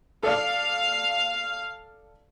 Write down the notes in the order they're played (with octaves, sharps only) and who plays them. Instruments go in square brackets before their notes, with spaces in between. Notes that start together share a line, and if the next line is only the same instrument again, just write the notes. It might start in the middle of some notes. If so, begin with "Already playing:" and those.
[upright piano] A4 D5 [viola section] F5